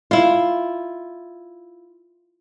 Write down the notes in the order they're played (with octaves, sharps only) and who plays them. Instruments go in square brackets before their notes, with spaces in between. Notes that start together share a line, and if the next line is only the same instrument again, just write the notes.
[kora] E4 F4